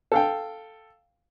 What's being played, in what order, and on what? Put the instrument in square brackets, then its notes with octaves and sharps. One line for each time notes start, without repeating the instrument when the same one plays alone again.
[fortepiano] A4 F5 G5